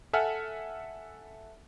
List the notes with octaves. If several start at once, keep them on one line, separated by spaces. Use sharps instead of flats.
A4 E5 F#5 G#5 F6